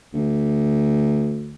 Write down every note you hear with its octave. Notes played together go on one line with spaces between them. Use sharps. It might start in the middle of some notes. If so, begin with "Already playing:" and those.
D2